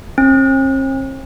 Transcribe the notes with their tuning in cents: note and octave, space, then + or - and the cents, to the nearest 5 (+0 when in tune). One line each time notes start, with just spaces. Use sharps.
C4 +45